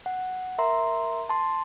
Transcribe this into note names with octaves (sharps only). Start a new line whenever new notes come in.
F#5
A#4 E5 A#5 C6
A5 C6